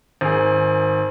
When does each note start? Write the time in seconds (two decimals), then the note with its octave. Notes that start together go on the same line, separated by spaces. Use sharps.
0.21 G#1 G#4